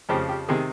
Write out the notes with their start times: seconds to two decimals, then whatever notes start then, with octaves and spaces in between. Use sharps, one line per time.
0.09 F2 C#3 F3 G4
0.29 G4
0.49 C3 D#3 G#4